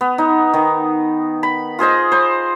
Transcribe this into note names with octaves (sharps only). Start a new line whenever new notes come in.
B3
D#4
D#3
B5
F4 G#4 C5 D#5
C5 B5